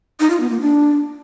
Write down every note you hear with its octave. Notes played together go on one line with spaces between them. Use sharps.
D#4
F4
B3
A#3
D4